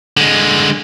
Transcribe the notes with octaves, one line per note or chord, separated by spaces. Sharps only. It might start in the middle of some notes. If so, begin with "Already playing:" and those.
D3 G#3